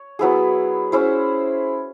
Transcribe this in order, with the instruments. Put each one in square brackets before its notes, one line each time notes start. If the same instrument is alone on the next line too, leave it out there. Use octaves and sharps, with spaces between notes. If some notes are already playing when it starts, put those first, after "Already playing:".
Already playing: [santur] C#5
F#3 B3 E4 G#4
C#4 E4 G#4 C5